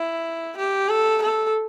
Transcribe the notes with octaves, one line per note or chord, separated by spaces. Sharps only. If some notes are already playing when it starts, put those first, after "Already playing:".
Already playing: E4
G4
A4
A4